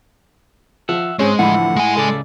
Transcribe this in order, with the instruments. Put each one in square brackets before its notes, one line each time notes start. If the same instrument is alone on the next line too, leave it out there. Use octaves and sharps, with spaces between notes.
[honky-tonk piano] F3 [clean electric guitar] E5 F#5
[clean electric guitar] G#2 C4 [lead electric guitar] G#3 [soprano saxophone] C#4 [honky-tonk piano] G#4 C5
[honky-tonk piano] A2 B5 [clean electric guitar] D3 E3 F3 [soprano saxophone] F#5
[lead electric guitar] G#3 G#5
[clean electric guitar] C#2 C#3 D5 [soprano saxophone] A4